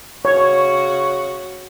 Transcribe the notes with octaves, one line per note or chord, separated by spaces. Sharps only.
C#3 F#4 C#5 C#6